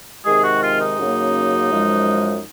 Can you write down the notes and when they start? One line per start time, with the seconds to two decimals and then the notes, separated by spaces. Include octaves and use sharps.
0.25 C3 D#3 G#3 G#4
0.44 F#4
0.62 F4
0.80 D#4
0.98 F#2 C#3 F#3 A#3
1.71 F#2 F3 G#3